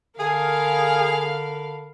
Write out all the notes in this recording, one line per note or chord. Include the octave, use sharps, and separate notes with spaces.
D3 G#4 A#4 F5 B5